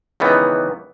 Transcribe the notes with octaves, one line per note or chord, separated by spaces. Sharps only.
C#2 D#3 E3 B3